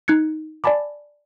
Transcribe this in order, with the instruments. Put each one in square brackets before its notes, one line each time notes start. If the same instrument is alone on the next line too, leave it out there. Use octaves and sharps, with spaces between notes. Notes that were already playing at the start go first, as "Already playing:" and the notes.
[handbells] D#4 F#6 G#6 C#7
D5 G#5 A5 B5 D6